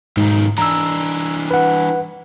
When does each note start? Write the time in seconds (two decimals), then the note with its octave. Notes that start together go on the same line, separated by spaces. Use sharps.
0.17 B1 G#2 D#3
0.58 E3 D4 A#5 E6
1.51 B4 F#5